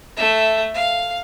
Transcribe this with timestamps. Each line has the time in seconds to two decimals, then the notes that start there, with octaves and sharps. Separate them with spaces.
0.17 A3 E5
0.74 F5